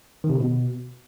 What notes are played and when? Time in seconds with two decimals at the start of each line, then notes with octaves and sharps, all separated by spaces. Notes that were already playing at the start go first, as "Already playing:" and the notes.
0.24 D#3
0.29 C3
0.35 D3
0.40 B2